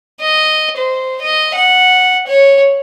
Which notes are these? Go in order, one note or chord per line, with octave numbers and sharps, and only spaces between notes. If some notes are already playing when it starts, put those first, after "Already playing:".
D#5
C5
D#5
F#5
C#5